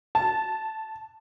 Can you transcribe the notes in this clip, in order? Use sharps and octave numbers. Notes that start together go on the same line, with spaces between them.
A5